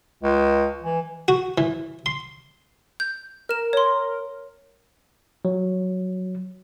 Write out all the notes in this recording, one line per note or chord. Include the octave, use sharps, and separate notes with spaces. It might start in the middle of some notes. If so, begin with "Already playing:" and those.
C#2
E3
F#4
E3
C6
G6
A#4 F6 E7
C#5 C6
F#3